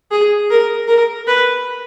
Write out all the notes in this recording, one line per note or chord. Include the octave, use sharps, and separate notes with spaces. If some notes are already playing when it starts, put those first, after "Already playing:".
G#4
A#4
A#4
B4